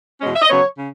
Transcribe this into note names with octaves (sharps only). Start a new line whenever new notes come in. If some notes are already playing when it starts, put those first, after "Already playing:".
E2 B2 G#3 C#4
E5
D#5
C#3 F#3 B3 C#5
C#3